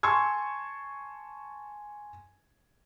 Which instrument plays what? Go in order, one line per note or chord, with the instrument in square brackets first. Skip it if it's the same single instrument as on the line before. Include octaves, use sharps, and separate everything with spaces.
[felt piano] G#5 A5 C6 C#6 E6 G#6